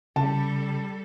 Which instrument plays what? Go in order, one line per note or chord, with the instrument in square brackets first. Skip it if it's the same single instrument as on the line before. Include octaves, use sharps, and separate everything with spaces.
[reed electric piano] C#3 [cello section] G3 A4 [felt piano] A5